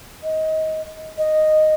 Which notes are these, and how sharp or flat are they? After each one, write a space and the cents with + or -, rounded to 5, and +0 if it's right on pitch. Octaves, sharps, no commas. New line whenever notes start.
D#5 +20
D#5 -5